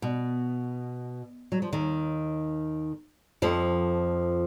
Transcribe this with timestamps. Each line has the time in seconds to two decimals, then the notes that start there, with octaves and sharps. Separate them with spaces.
0.02 B2
1.52 F#3
1.62 F3
1.72 D#2 D#3
3.42 F2 F3